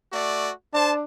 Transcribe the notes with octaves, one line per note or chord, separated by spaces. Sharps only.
A3 F#4 D5
D4 C5 A5